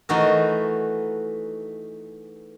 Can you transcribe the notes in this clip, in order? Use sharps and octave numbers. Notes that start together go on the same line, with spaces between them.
E3 A3 D#4 F#4 G#4 A#4